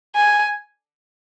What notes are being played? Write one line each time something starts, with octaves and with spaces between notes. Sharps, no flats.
G#5